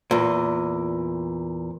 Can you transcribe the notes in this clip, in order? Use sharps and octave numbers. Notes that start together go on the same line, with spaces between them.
E2 A#2